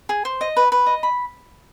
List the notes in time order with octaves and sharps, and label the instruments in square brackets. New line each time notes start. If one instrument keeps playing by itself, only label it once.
[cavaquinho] G#4
C5
D#5
B4
B4
D#5
B5